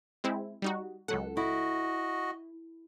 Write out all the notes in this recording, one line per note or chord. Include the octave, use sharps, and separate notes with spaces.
G#3 C4 E4
G3 D#4 F#4
C#2 F#3 A4 F#5
E4 F#4 D#5